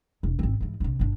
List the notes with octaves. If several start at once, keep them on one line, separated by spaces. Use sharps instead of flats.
E1
G#1 C4
G#2 E3
A#1 C3
G1 D4